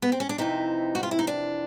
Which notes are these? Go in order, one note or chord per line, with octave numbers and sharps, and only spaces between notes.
B3
C4
C#4
D4
F2 C3 E3 D#4
F#4
F4
E4
D#4
D4